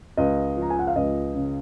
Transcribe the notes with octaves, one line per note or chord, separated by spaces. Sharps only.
C#2 D#5
F3
A#5
G#5
F#5
F5
C#2 D#5
C#3